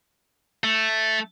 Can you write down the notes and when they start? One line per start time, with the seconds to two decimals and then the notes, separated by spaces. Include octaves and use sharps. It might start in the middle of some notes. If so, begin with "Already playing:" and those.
0.64 A3